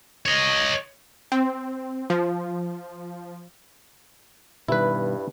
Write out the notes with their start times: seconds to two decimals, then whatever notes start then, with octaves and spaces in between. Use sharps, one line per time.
0.26 C#5 D#5
1.32 C4
2.10 F3
4.68 G2 B2 D#3 G3 E4 B4